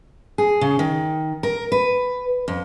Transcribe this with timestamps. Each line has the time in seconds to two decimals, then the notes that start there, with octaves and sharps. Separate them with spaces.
0.38 G#4
0.61 C#3
0.79 D#3
1.43 A#4
1.72 B4
2.48 F2